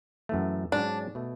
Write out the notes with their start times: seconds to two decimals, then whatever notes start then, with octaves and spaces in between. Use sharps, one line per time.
0.29 F#2 E3 A3
0.72 G#2 F#3 C#4 D4
1.15 B2 A3